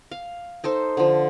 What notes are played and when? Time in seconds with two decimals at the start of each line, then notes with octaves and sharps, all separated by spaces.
0.11 F5
0.64 D#4 A4 C5
0.97 D3 F3